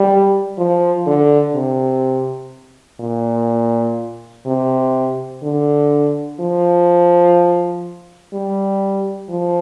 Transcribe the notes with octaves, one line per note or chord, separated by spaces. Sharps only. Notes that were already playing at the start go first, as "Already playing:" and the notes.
Already playing: G3
F3
D3
C3
A#2
C3
D3
F3
G3
F3